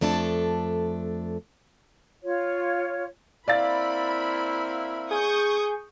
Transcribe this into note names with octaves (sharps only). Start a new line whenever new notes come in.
F2 A3 D4 A4 A5
F4 C#5
A#3 C4 E4 D5 F5 B5 A6
G#4 C#6 D#6 G6